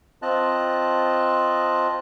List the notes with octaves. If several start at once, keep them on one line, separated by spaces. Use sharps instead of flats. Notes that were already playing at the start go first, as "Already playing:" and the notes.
C4 F4 D#5 A5 F#6